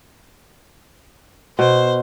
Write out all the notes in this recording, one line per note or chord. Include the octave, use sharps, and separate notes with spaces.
B2 C5